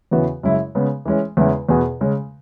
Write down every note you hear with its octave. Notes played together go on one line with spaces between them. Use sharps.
E2 C#3 E3 B3 F#4
F#2 C#3 G#3 E4
C#3 G#3 B3
E3 G#3 C#4
E2 C#3 G#3 B3 E4
E2 B2 B3 G#4
C#3 G#3 C#4